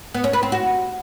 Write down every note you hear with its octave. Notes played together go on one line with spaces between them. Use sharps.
B3
C#4
B4
C4
F#4